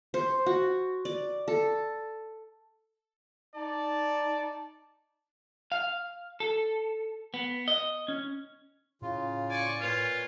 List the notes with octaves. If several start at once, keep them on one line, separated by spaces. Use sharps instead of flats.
C5
F#4
D5
A4
D#4 D5 A5
F5
A4
B3
D#5
C#4
A2 C#3 F4
D5 G#5 C#6
A#2 F4 B4 C#5